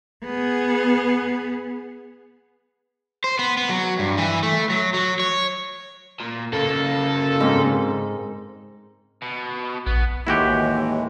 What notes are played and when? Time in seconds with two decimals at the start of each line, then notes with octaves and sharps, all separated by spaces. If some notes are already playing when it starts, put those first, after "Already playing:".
0.24 B3 G#4
3.24 C5
3.39 B3
3.57 B3
3.70 F#3
3.99 G2
4.18 E3
4.43 A3
4.70 F#3
4.94 F#3
5.20 C#5
6.20 A#2
6.53 C#3 A#3 A4
7.40 G#2 C4 A#4
9.22 B2
9.87 A#1 B3
10.27 D#2 A2 E3 G#3 E4 F#4 G4